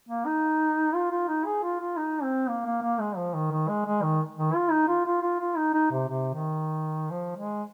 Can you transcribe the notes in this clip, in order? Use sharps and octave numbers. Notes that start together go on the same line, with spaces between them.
A#3
D#4
F4
F4
D#4
G#4
F4
F4
D#4
C4
A#3
A#3
A#3
G#3
F3
D#3
D#3
G#3
G#3
D#3
D#3
F4
D#4
F4
F4
F4
F4
D#4
D#4
C3
C3
D#3
F3
G#3